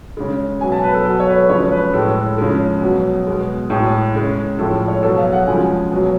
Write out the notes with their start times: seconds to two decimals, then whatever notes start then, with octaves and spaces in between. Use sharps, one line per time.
0.17 C#3 G#3
0.61 B2 F#3 G#5
0.72 A5
0.83 B4
0.94 A4
1.05 B2 F#3 A4
1.20 C#5
1.27 B4
1.49 C#3 F3 G#3 C#5
1.71 B4
1.93 A2 G#3 A4
2.38 C#3 F3 G#3
2.82 B2 F#3
3.27 B2 G#3
3.70 A2 G#3 G#4
4.15 C#3 G#3
4.59 A2 F3 G#3 A4
4.88 C#5
5.03 B2 F#3 A4
5.18 F5
5.33 F#5
5.47 C#3 F3 G#3 G#5
5.92 B2 F#3